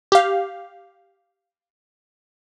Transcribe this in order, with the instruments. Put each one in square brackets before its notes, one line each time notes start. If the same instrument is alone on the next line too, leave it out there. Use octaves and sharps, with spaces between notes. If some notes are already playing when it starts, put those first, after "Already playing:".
[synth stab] G4 F5